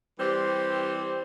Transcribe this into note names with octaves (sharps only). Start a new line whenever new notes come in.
E3 G3 C4 G4 C5 D5